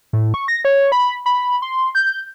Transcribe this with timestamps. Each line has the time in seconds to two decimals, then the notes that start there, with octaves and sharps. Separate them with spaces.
0.13 A2
0.34 C#6
0.48 A#6
0.65 C#5
0.92 B5
1.26 B5
1.62 C6
1.95 G6